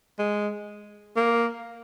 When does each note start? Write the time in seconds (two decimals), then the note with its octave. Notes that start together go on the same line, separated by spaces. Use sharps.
0.19 G#3
1.17 A#3